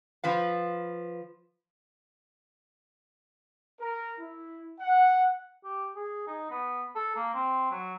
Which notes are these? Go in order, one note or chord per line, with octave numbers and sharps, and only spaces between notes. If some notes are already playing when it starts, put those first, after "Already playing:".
F3 B4 F5
A#4
E4
F#5
G4
G#4
D#4
B3
A4
A#3
C4
F#3